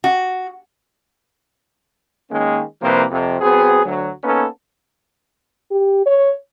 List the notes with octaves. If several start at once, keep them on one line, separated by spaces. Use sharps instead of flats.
F#4
D#3 G#3 A#3 C#4
C2 C3 F3 A#3 B4 C5
F2 C3
F#3 B3 C4 G#4
D2 F#3
A#3 B3 C#4 D#4 A4 B4
G4
C#5